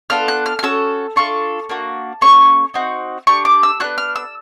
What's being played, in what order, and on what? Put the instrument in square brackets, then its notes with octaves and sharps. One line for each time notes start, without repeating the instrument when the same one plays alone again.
[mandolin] B3 D4 F4 A4 F6
F#6
F6
F6
C#4 F#4 A4 E6
D4 F4 A4 C#6
A#3 D4 F#4
A#3 C#4 G#4 C#6
C4 D#4 F#4
D4 G4 C#6
D6
E6
B3 D4 F#4 F#6
F6
E6